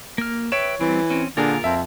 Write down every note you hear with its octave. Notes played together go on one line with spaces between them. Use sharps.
A#3 F6
B4 C#5 E5 G5 D7 E7
E3 G3 C4
C4 C#4
A#2 D3 A#3 F4 G#4 A#4 F5
F2 E5